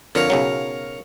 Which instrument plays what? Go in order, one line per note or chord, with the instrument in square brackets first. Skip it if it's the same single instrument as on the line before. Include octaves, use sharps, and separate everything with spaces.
[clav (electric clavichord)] F2 D3 [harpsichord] A#4 C#5 F5
[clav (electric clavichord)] B1 C#3 F#3